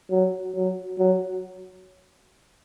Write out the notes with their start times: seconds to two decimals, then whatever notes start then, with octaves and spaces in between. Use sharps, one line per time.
0.11 F#3
0.55 F#3
0.99 F#3